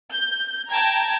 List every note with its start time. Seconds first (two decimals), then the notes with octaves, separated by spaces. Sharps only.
0.12 G6
0.71 G5 A5 A#5 G#6